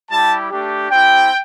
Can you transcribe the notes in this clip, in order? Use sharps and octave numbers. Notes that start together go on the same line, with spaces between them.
G3 E4 G4 A5
A3 D4 G4
C4 E4 G4 G5